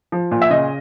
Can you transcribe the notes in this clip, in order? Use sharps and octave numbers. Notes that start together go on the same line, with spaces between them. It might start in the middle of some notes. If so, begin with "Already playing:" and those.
F3
A#2
E5
C#3 D#5